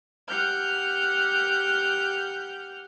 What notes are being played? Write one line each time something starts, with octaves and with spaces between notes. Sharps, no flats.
G4 F#5 F6 G6